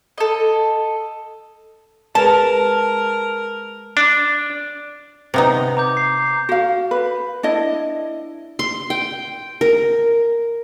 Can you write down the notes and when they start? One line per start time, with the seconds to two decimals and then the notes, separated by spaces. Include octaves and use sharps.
0.18 A4 D#5
2.15 G#3 G#4 A#4 B4 A5
3.97 D4
5.34 C3 B3 D#4
5.77 A#5 D6 G6
5.97 C7
6.49 F#4 F5
6.91 B4
7.43 D4 E4 D#5
8.59 C6
8.90 G5
9.61 A#4